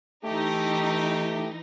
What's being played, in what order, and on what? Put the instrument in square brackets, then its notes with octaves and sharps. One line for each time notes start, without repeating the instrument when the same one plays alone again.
[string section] E3 D#4 [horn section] A3 G4